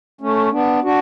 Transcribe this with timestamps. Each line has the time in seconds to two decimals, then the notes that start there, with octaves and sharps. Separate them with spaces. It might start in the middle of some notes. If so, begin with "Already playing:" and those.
0.21 A3 C#4
0.52 B3 D4
0.83 D4 F#4